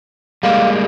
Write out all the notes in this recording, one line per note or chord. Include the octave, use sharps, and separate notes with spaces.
G3 G#3 A#3 F5